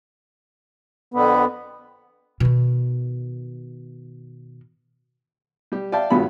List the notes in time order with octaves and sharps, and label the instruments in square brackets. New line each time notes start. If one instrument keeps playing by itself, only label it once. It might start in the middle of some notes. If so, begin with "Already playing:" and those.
[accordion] F2 D3 [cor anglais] B3
[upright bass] B2 D#3
[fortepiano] G3 G4
D5 E5 F5 G5 A5
G#1 G2 B3 F4 F#4 B5